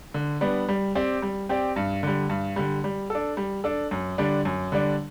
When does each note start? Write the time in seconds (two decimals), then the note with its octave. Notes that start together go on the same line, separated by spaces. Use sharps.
0.14 D3
0.41 G3 B3 D4
0.68 G3
0.95 C4 G4 D5
1.22 G3
1.49 C4 G4 D5
1.76 G2
2.03 D3 G3
2.30 G2
2.56 D3 G3
2.84 G3
3.10 D4 A4
3.37 G3
3.64 D4 A4
3.91 F#2
4.18 D3 G3 D4
4.45 F#2
4.72 D3 G3 D4